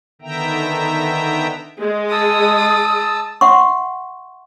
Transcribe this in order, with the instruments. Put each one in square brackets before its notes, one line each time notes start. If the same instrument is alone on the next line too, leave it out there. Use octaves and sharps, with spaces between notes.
[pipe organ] D3 D#3 B3 E5 G5 A#5
[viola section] G#3
[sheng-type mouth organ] A5 E6 [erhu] D#6
[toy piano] E5 F#5 C6 C#6